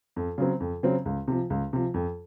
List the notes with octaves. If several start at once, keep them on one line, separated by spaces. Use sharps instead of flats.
F2
C#3 F#3 C4
F2
C#3 F#3 C4
C#2
C3 F3
C#2
C3 F3
F2